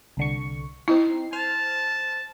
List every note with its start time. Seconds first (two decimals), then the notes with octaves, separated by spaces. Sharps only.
0.17 C2 D3 C#6
0.88 C4 D#4 E4 C7
1.33 C5 A5 F6